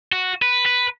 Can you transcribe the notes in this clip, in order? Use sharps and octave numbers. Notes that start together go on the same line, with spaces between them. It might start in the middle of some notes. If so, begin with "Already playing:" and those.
F#4
B4
B4